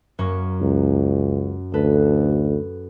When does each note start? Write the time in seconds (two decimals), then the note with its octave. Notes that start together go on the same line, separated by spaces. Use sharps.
0.19 F#2 A#3 C#6
0.61 C#2
1.74 D2 A4 B4